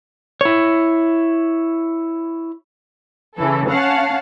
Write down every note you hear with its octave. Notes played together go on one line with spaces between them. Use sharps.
E4 C#5
C#3 E3 A4
C#4 F5 F#5 A5